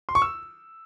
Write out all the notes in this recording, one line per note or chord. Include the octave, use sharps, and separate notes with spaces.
C6
C#6
E6